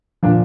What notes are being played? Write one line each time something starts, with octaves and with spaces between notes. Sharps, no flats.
A#2 F3 D4